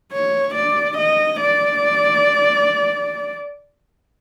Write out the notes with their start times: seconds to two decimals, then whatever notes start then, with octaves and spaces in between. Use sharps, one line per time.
0.12 C#5
0.55 D5
0.98 D#5
1.41 D5